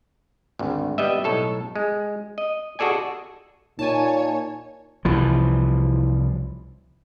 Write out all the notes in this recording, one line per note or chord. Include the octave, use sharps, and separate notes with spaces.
G#1 D2
G3 B3 D#5 E5
B1 A2 A4 C#5
G#3
D#5
F#4 G#4 A4 D5 G#5
A#2 D#4 C#5 G#5 A5
C2 E3 F3